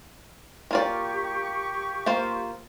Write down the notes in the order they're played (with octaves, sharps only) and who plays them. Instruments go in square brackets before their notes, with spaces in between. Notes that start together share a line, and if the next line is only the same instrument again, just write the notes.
[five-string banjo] A#3 F4 D5 [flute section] G4 C#6
[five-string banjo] A#3 F4 C5